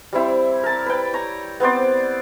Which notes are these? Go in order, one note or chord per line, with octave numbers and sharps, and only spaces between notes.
G3 C4 E4
A#4 A5
B4 G5
C#5 A#5
B3 C4 C5 D5